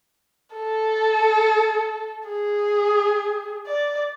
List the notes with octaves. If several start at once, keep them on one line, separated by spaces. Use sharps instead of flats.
A4
G#4
D5